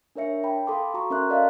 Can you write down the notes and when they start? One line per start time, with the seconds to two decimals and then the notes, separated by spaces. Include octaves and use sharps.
0.15 D4 A#4 C#5 E5 C#7
0.44 G5 A5 B5
0.67 A4 F5 A5 C6 D6
0.94 F#4 A#5 C#6
1.10 C#4 A#4 E5 A#5 C6 F#6
1.29 A4 A#4 D5 D#5 F5 A5